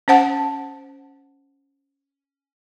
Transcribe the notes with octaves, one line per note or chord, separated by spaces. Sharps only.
C#4 C5 F#5 A5